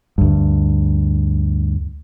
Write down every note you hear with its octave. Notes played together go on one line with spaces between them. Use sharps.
D2 G2